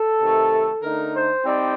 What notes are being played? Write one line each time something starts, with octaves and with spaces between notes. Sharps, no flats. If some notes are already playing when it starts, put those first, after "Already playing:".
Already playing: A4
C3 D#3 A3
D3 A3 D#4 A#4
C5
G3 C4 D#4 D5